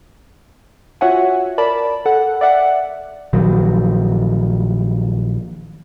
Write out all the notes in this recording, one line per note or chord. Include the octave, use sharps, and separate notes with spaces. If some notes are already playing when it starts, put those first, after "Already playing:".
F4 F#4 C#5 E5 F#5 G#5
A#4 D5 A5 B5
A4 F#5
D5 E5 F#5
A#1 D#3 F#3